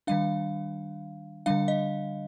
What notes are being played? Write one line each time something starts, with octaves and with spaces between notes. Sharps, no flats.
D#3 G3 D4 F5
D3 G3 D4 F5
D#5